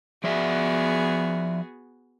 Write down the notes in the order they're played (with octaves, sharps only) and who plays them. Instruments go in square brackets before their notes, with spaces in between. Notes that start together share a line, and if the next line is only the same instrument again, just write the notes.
[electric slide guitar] F3 D5 E5 [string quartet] B3 F#4 G#4